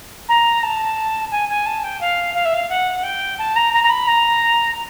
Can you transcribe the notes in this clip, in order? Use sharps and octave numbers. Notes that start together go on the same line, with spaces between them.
A#5
A5
G#5
G#5
A5
G5
F5
F5
E5
F5
F#5
G5
A5
A#5
A#5
A#5
B5
A#5